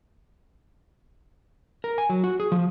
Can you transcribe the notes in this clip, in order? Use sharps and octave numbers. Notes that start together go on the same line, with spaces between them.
A#4
G#5
F#3
F#4
G#4
F3